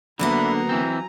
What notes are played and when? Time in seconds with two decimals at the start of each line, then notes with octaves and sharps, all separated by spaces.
0.19 D2 D3 F#3 A#3 B3 E5 A#5 B5
0.69 E3 C4 G#5